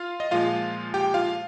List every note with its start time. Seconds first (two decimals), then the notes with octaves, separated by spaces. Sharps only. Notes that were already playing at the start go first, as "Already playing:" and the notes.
Already playing: F4 F5
0.20 D#5
0.31 A#2 F3 G#3 F4 F5
0.94 G4 G5
1.14 F4 F5